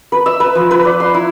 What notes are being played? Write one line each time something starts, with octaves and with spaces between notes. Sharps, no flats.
B4
E5
B4
F3
B4
D5
C6
E4